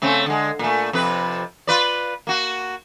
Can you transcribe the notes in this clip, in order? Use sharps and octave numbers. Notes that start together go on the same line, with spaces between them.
C#3 A3 C4
D3 G#3
A#2 A3
F2 C3 B4
F4 B4 D5
A#3 F#4